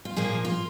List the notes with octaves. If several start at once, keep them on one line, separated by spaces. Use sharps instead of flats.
F4
A#2 F3 A#3 G#4
F4